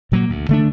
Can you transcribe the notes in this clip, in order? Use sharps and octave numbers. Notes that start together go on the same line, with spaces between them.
A#2 F#3 A#3
D2
D3 A3 D4